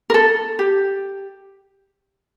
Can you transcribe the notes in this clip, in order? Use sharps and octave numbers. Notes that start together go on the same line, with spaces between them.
A#4
A4
G4